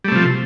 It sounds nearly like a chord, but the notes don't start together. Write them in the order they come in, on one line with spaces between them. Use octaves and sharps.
G3 A3 C3 F3